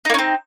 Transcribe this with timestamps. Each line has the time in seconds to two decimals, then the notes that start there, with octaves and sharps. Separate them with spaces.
0.05 D#4
0.10 A#3
0.14 C#4
0.18 C4